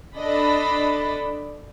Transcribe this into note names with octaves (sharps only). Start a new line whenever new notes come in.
D4 A4 D#5 B5